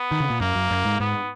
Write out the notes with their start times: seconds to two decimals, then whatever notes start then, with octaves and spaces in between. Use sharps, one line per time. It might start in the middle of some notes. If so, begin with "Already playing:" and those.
Already playing: B3
0.11 D#3
0.20 C#3
0.30 A#2
0.40 F#2 A#3
0.55 F#2
0.71 F#2
0.85 G#2
1.00 G#2 B3